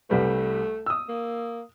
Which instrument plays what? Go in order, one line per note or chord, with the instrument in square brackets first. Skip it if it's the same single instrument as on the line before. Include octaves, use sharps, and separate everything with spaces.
[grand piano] C2 G3 B4 [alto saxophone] A3
[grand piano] D#6 E6
[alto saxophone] A#3